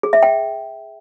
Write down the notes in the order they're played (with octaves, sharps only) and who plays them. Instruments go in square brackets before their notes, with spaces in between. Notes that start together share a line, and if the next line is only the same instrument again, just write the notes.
[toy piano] G#4
E5
G5